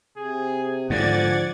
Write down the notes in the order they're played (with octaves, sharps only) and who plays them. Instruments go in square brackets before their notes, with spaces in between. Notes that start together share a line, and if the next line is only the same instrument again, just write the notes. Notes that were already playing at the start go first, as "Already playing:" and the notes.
[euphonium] C3 [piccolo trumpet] G#4
[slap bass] G#2 D3 [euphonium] F3 [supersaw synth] D5 G#6 A6 [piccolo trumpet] F#5